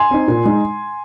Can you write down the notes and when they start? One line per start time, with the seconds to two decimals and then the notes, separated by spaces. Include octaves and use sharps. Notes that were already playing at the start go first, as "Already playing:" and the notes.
Already playing: G#5 C6
0.11 C4 D#4
0.28 A#2
0.45 G#3 D#4